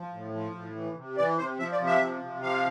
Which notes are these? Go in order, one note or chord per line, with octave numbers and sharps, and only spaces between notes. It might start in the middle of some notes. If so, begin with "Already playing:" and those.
Already playing: F3
A2
F3
A2
E3
C3
E3 D5
C3 C5
F3 E5
D5
C3
E5
F3
C3
F3 F5